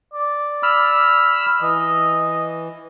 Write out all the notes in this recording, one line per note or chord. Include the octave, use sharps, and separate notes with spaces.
D5
B5 E6 F6
E3 D#5